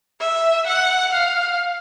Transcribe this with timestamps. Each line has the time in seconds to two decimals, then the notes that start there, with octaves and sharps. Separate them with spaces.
0.20 E5
0.67 F#5
1.13 F5